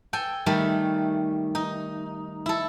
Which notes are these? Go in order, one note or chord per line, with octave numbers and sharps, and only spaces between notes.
A4 G5 G#5
D#3 G3 A3
D#4
E4 A4